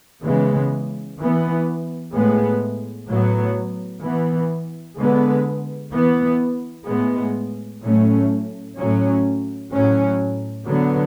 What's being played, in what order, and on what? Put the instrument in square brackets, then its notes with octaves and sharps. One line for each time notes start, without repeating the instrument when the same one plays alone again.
[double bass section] C#3 E3 G#3 B3
E3 B3
A2 G#3 B3
A2 F#3 B3
E3 B3
D3 G#3 B3
E3 B3
A2 G#3 B3
A2 F#3 A3 C#4
A2 F#3 C#4
A2 F#3 C#4
D3 F#3 B3